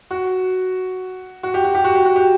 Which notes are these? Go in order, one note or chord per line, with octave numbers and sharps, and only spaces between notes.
F#4
F#4
G4
F#4
G4
F#4
G4
F#4
G4